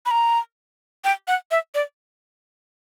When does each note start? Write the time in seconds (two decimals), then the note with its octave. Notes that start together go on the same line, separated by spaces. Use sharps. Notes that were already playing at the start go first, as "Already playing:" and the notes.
0.06 B5
0.11 A#5
1.04 G5
1.28 F#5
1.51 E5
1.75 D5